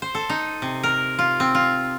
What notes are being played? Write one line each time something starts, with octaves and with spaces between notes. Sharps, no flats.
C5
A4
D#4
C3
A#4
F4
C4
F4